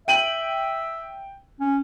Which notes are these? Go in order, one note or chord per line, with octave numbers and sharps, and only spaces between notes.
E5 G5 D#7 F#7
C#4